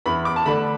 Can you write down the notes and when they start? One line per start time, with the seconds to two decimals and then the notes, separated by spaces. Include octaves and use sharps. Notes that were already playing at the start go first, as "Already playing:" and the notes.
0.06 E2 B5
0.25 D6
0.36 A5
0.46 D3 A3 D4 B5